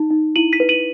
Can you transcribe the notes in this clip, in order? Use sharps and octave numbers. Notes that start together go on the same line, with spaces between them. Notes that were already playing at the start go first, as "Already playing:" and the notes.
Already playing: D#4
D#4
E4 D#7 F#7
B6 D#7
B4
D#7 F#7